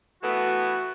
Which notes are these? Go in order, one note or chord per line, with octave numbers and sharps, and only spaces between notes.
E3 A3 B3 F#4